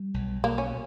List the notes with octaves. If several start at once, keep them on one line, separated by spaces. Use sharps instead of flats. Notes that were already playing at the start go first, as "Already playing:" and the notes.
Already playing: G3
B1
B2 A#3
C#4